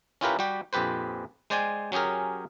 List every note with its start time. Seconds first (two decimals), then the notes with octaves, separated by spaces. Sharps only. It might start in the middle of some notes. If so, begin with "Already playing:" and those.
0.21 C#4 E4 F4 G4 A#4 B4
0.39 G3 F#4 G4
0.73 A#1 F2 G4 B4 C5
1.50 G#3 C5 D5 G5 G#5
1.92 F#3 C#4 G4 G#4 A#4